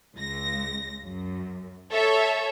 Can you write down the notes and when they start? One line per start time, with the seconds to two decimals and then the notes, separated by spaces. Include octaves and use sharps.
0.16 C#2 A#6
1.03 F#2
1.92 A4 C#5 E5